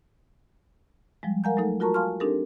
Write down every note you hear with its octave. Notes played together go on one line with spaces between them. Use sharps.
F3 G3 G#3
A#4 F5 F#5 G#5 A#5 G6
F#3 A3 D#4 A4
F4 F#4 A#4 A5 A#5 C#6
F5 G#5 A5 C6 C#6 F6
C4 D4 D#4 G4 A4 A#4